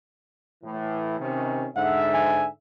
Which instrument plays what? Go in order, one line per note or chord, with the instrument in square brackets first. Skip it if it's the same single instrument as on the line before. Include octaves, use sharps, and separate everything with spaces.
[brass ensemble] A2 E3
C3 D#3 C#4
[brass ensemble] G#2 D3 E5 [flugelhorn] F#5
[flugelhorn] G#5